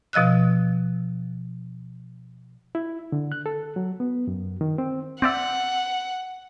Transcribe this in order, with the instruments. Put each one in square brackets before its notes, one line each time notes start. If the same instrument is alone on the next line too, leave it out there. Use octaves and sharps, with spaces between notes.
[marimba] B2 F3 D#5 E6 F#6
[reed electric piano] E4
D3
F#6
A4
F#3
B3
F#2
D#3
C4
[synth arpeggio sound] C4 D5 E5 [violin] F#5